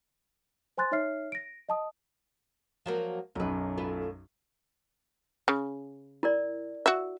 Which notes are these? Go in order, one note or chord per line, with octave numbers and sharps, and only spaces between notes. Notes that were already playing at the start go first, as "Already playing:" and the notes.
C5 G#5 C6 F#6 A6
D#4 C#5 E5 F6 C7
A#6 D7
D#5 A5 D#6
F3 F#3 A#3
B1 F#2 D#4 B4
A3 F4 B4
C#3
E4 A#4 D5
F#4 E5